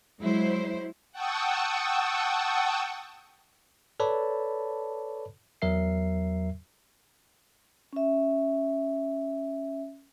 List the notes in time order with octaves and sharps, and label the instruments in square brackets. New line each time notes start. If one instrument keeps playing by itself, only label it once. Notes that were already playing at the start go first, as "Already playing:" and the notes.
[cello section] F#3 G#3 E4 C5
[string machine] F#5 G5 A5 C#6 D#6 E6
[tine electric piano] A4 B4 C#5 D5 A5 B5
E2 F#3 A#4 E5 C7
[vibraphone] C#4 E5